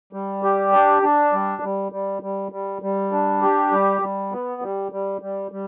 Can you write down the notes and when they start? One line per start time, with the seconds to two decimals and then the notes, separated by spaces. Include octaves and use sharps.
0.13 G3
0.43 G4
0.73 D4
1.02 D4
1.33 G3
1.62 G3
1.92 G3
2.22 G3
2.52 G3
2.82 G3
3.12 D4
3.42 G4
3.72 G3
4.01 G3
4.32 B3
4.62 G3
4.92 G3
5.22 G3
5.51 G3